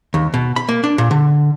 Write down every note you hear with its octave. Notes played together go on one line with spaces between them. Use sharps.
D#2
B2
B5
A#3
D4
A#2
D3